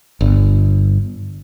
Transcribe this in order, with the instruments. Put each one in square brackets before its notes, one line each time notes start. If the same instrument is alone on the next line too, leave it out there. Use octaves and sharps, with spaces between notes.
[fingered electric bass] G1